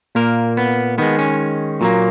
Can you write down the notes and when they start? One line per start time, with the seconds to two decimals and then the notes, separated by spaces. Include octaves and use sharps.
0.15 A#2 A#3 A#4
0.57 B3
0.98 D#3 G#3 B3
1.19 C#4
1.81 A#2 F#3 A#3